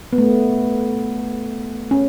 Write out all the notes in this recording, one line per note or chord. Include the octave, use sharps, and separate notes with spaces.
B3
A3
C#4